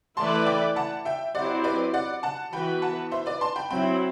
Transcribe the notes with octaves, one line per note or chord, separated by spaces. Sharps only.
E3 A3 E4 B4 D5 A5 C6
G5 B5
F#5 A5
E5 G5
F#3 C4 E4 G4 D5 F#5
B4 D5
D5 F#5
F#5 A5
E3 B3 F#4 B4 G5 B5
F#5 A5
C5 E5
B4 D5
A5 C6
G5 B5
F#3 C4 E4 G5 B5